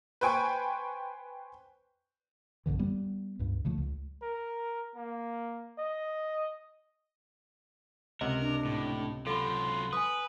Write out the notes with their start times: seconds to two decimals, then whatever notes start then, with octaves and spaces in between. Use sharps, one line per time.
0.21 B4 C5 G5 G#5 C#6
2.66 A#1 F#2 D3 E3
2.79 G3 B3
3.39 C#2 G2
3.65 C#3 F3 A3
3.78 C#2
4.22 A#4
4.96 A#3
5.78 D#5
8.21 C#2 C3 A#4 D#5 F#5
8.41 D4
8.65 A2
9.27 F#3 F4 A4 B5 C6
9.93 B4 G#5 D#6